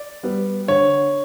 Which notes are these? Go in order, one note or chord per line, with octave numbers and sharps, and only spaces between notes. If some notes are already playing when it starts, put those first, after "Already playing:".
Already playing: D5
G3 B3
D3 C#5